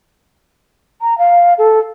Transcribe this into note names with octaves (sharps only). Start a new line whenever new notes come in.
A#5
F5
A4